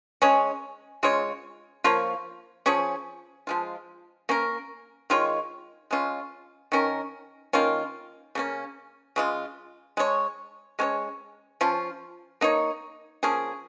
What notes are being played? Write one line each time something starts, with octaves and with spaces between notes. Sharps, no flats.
G#3 C#4 G#4 C#5
C#3 G#3 F4 C#5
F3 A#3 F4 C#5
F3 C#4 G#4 C#5
F3 G#3 F4
A#3 C#4 A#4
D#3 G#3 F4 C#5
G#3 C#4 F4
D#3 C#4 A#4
D#3 A#3 C#4 F4
C#3 A#3 C#4
C#3 G#3 F4
G#3 D#4 C#5
G#3 C#4 G#4 C#5
F3 C#4 F4
A#3 D#4 C#5
F3 A#3 C#4 G#4